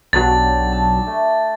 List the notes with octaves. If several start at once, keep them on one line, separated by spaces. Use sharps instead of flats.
B1 F#3 D4 G4 A6
A5
A3